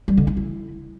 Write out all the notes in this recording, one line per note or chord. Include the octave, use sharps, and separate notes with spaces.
G3
D3
D#4
E4